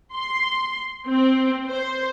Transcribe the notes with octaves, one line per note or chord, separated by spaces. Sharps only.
C6
C4
C5